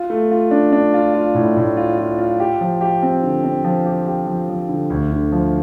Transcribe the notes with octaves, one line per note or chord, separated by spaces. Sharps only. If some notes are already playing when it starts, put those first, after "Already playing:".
Already playing: F4
A3
F4
D4
D4
F4
F4
A2
A2
F4
F4
F4
G4
F3
G4
C4
D3
C4
F3
G4
G4
F3
F3
D3
D2
D3
F3